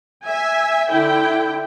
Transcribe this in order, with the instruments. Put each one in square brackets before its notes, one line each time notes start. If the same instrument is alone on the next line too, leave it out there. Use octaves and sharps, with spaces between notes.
[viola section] E5 G#5
D3 E4 G5